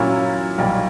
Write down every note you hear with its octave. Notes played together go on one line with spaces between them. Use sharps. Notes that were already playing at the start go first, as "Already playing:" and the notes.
Already playing: A#2 F#3 A#3 C#4 E4
B1 A#2 G3 A#3